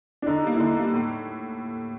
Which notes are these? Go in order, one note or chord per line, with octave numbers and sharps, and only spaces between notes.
D4
D3 D#4
G3 A#3
E4
D3 D#4
G3 A#3
A2